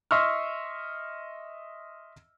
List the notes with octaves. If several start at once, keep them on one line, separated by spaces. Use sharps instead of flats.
D#5 E5 C6 C#6 E6 F6